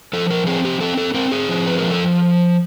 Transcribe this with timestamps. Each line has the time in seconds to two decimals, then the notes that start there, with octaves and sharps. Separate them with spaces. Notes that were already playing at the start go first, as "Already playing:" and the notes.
0.13 F3 A4
0.30 A#4
0.47 C4 G#4
0.65 G4
0.81 C4 A4
0.97 A4
1.14 C4 A#4
1.31 G#4
1.49 F3
1.67 B4
1.78 F3 A#4
1.91 A4